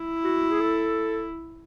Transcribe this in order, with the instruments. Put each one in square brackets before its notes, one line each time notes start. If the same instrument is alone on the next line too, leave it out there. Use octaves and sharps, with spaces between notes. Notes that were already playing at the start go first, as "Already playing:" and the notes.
Already playing: [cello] E4
[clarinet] F#4
G#4
A4